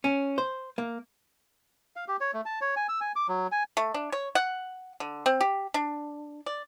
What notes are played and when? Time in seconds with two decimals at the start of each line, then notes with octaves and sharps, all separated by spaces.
0.04 C#4
0.38 C5
0.78 A#3
1.96 F5
2.08 G4
2.21 C#5
2.34 A3
2.45 A5
2.61 C#5
2.76 G#5
2.89 E6
3.01 G#5
3.16 D6
3.28 F#3
3.52 G#5
3.77 A3
3.94 D4
4.12 C#5
4.35 F#5
5.00 D3
5.26 C4
5.41 G4
5.74 D4
6.46 D5